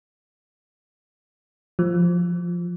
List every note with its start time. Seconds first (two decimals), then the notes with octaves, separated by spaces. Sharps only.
1.79 F3